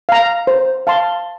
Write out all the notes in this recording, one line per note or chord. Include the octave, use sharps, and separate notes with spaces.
F5 A#5
C5
F5 A5 C6